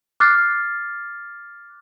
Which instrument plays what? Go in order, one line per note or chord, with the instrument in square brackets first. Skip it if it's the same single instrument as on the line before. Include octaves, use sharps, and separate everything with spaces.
[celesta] D6 F6 F#6 A6 C7